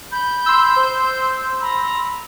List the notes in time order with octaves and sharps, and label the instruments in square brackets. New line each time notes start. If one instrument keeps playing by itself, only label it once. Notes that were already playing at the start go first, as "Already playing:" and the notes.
[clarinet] B5 [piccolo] G6
[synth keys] C6 E6
[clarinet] C5
[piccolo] A#5 [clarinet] B5